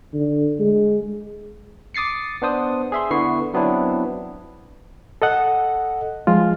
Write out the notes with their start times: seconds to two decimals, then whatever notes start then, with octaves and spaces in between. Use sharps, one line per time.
0.13 D3
0.59 G#3
1.94 D6 D#6 A6 C7 C#7
2.42 B3 D4 C5 D#6
2.92 G#4 E5 C6
3.11 D3 B3 E4 C#6 C7
3.54 F#3 B3 C4 D4 E4
5.22 A4 D#5 F#5
6.27 F3 G#3 F4